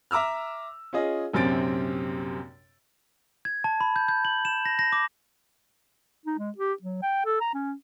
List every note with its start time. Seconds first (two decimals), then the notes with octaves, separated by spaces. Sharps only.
0.11 E5 A#5 D6 E6 F6
0.93 C#4 F4 G#4 D#5
1.34 A#1 F#2 C3 C4 A6 D7
3.45 G#6
3.64 A5
3.81 B5
3.96 G6
4.08 G6
4.25 F#7
4.45 E7
4.65 A#6
4.79 A#6
4.93 D6
6.26 D#4
6.39 G#3
6.58 G4
6.82 F#3
7.02 G5
7.25 A4
7.41 A#5
7.54 C#4